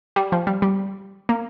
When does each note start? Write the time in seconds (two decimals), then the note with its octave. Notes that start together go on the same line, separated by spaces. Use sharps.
0.16 G3
0.32 F3
0.47 G3
0.62 G3
1.29 A#3